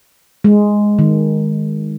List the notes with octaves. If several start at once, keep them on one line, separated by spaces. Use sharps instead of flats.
G#3
D#3